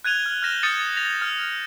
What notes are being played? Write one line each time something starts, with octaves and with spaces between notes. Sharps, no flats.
F#6 G#6 D#7 F7 G7
F6
F6 G6 A#6 E7 G7
D#6 G6 A6 C#7 D#7
A#6 F7
F6